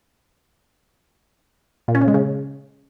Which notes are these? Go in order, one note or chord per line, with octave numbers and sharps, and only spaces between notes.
A#2
C#4
C#3
G#3
C#3